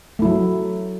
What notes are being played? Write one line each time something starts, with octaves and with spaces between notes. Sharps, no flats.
F#3 A3 E4